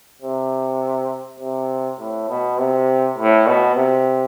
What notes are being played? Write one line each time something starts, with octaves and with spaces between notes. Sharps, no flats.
C3
C3
A2
B2
C3
A2
B2
C3